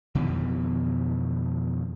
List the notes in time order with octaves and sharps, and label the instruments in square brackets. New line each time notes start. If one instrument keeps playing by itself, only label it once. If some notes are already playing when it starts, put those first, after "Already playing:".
[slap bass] F2 B2 D#3 E3